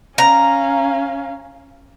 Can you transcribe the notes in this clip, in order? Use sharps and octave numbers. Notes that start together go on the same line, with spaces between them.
C#4 F5 A#5